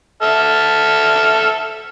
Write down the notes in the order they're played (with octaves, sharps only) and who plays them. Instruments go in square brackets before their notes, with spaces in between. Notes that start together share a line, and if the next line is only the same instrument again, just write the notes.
[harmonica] A4 E5 F6